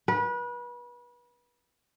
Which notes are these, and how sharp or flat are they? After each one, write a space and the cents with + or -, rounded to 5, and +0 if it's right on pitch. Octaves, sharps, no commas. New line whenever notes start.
B4 -30